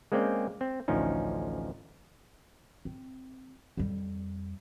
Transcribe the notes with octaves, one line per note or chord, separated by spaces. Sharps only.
G#3 A#3 C4 C#4 D5 G5
C4
A1 D2 F3 C#4 D#4
C4
F2 G3